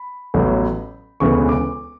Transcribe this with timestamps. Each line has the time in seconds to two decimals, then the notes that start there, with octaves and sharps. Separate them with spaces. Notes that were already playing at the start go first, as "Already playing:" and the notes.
Already playing: B5
0.34 A1 A2 F#3 B3
1.20 E1 D2 C#3 E3 B3 C#6
1.49 D6